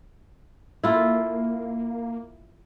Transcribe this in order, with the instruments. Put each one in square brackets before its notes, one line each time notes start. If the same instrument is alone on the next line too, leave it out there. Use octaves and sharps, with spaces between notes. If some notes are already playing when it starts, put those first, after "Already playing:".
[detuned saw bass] A#3 [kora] E4 F4 A4